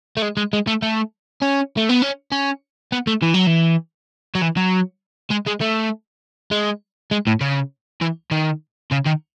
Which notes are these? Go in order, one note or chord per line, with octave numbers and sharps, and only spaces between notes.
A3
G#3
G#3
G#3
A3
A3
C#4
A3
B3
C#4
C#4
B3
A3
E3
F#3
E3
F#3
E3
F#3
G#3
G#3
A3
G#3
G#3
A2
C#3
E3
D#3
C#3
D#3